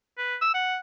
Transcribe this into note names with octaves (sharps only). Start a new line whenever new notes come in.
B4
E6
F#5